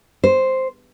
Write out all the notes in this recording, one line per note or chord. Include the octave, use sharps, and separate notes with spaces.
C5